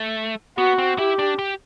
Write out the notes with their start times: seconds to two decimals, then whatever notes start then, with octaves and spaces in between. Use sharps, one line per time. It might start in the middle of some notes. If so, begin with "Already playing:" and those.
Already playing: A3
0.58 B3 F#4
0.78 C4
0.98 E4 G4
1.19 D4
1.39 G4